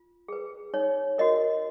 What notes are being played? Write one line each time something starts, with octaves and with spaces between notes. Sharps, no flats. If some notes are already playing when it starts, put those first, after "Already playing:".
Already playing: F4
G#4 B4
D#4 C#5
F#4 A#4 D#5